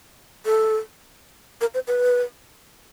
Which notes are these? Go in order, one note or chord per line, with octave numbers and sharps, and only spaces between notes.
A4
A#4
C5
B4